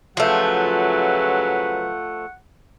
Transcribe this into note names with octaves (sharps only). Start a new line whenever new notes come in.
C#3 F3 F#3 A3 B4 F#5